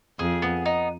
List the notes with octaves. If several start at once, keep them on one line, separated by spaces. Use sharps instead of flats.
F2 G#4
B3
D#4